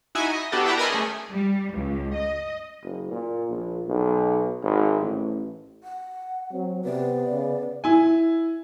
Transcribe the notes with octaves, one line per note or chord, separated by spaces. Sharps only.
D#4 E4 F#4 E5 G#5
D#5
B3 D4 F#4 G4 A4
E4 B4 D5 E5 G5 A#5
A#4 D5 D#5 G#5 B5 C6
A3 C#4 G#4
G3
C#2
D#5
F#1
A#2
A#1
B1
G#1
A1
F#5
F#3 C4
C3 B3 D5
C#3
E4 G#5